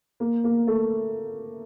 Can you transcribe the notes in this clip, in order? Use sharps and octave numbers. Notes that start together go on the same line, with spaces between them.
A#3
A#3
A3